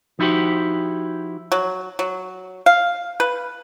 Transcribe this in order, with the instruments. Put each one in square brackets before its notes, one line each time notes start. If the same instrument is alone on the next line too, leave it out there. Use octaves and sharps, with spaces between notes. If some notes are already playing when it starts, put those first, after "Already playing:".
[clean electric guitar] F3 D#4 E4 F#4 G4 C5
[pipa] F#3
F#3
F5
B4